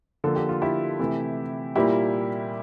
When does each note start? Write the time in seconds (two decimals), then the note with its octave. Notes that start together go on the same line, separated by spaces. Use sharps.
0.24 D3 F3 A#3 A4
0.36 G4
0.49 F4
0.62 E4 G4
0.99 C3 E3 A3
1.76 A#2 G3 A#3 E4 G4